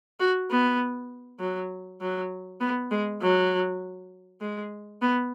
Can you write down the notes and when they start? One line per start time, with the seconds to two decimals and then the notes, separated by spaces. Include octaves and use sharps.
0.20 F#4
0.51 B3
1.40 F#3
2.01 F#3
2.61 B3
2.91 G#3
3.22 F#3
4.41 G#3
5.02 B3